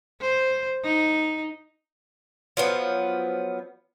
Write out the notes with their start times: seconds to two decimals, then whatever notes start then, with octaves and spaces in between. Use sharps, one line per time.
0.21 C5
0.84 D#4
2.57 F3 F#3 B3